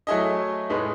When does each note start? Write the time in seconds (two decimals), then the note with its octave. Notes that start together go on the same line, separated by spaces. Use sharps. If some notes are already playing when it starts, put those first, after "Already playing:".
0.07 F#3 A3 E4 G#4 D#5
0.70 A2 G#3 B3 D#4 G#4